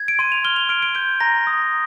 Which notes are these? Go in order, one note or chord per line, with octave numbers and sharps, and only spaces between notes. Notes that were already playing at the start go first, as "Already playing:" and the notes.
Already playing: G#6
D7
C6 D#7
F7
F6 G7
F7
F6 D7
D7
G6 D7
A#5 A#6
D#6